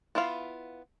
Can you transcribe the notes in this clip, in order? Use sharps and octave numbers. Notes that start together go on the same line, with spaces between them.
B3 E4 F4 F5